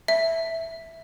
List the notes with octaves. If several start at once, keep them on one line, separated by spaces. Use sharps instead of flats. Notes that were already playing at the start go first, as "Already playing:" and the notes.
E5